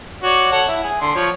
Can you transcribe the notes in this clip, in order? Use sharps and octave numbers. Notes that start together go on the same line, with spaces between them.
F#4 C#5 D5
A4 C#5 F#5
E4
G#4
D3 C6
F3 C#5